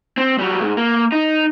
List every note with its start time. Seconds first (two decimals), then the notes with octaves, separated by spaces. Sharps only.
0.18 C4
0.39 F#3 G3
0.60 C#2 G#2
0.77 A#3
1.12 D#4